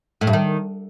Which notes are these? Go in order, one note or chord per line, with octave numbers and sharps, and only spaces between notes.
A2
G2
D#3